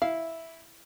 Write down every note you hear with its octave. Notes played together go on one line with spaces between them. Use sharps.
E4 F5